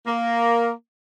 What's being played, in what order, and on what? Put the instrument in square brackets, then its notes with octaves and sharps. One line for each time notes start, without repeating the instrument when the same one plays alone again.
[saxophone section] A#3